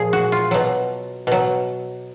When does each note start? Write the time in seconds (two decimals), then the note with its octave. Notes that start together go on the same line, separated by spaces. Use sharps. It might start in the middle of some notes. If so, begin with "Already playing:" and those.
Already playing: A#2 F3 G#3 G#4
0.13 F#4
0.32 F4
0.51 B2 F#3
1.27 B2 F#3